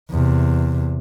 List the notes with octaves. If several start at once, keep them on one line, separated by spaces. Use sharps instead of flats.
E2 C3